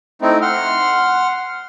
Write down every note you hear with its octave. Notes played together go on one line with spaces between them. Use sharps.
A3 C4 D#4 E4
F#5 C6 F6